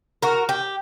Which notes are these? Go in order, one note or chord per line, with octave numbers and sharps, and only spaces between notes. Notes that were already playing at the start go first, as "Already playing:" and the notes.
F#4 A#4
G4